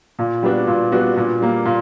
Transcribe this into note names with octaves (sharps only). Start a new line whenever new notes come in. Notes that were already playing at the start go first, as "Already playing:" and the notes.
A#2
G3 B3 D4 F#4
A#2
G3 B3 D4 F#4
A#2
G3 A#3
A#2